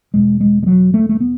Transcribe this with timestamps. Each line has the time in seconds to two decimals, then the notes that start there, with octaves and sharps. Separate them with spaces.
0.14 E2 B2 G#3
0.41 G#3
0.63 G#3
0.66 F#3
0.94 A3
1.09 A3
1.20 B3